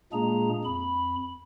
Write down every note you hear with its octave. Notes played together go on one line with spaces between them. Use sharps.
A#2 G#3 A#3 D4 G#4 A#5
F2 B5